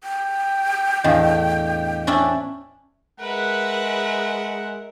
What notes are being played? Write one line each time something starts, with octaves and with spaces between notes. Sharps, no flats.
G5
E2 A2 D4 D#5 F5
C#4 D4 E4
G#3 A#4 B4 E5 F#5